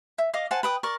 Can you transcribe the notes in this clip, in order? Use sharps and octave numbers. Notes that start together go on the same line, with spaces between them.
E5
D#5 F5 D6
C5 F#5 G#5 A5
B4 G5 D#6
A#4 D5 C#6